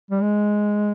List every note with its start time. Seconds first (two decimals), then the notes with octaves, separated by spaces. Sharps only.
0.11 G3
0.22 G#3